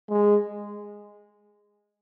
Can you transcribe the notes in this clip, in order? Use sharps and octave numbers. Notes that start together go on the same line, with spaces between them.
G#3